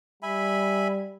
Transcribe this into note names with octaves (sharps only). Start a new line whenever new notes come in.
G3 E5 G#5 B5